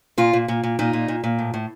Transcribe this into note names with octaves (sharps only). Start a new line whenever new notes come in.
A#2 F4
A#2
A#2
A#2
A#2 D#4
A#2
A#2
A#2
A2
A2